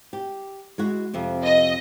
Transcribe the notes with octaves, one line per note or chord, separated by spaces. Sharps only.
G4
G#3 E4 F#4
F2 C3 C4
D#5